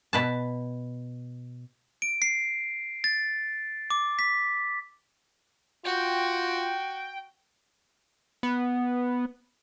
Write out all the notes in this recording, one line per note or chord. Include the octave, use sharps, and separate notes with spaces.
B2 B4 A5
D7
C7
A6
D6
B6
F4 F#4 G5
B3